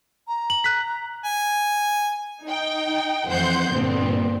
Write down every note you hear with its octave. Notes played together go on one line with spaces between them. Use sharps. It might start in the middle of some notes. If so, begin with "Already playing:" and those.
A#5
F#7
F#6 B6
G#5
D#4 G5
F2 E3 C5 F#5 C6 G6
G2 A#2 D3 B3 C4